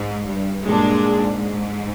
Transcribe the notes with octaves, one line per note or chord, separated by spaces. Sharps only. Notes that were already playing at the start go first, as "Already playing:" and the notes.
Already playing: G#2
G2
G2 A#2 G#3 D4
G#2